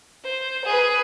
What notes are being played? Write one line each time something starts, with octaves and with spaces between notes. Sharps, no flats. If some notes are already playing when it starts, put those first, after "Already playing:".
C5
G#4 B4